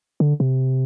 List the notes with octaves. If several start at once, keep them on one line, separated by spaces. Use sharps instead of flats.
D3
C3